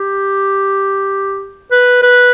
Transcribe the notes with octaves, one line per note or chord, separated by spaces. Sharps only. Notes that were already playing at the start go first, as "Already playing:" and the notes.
Already playing: G4
B4
B4